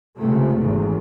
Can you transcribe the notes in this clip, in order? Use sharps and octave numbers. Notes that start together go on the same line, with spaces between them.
C#2 C3 A3
G#1 E2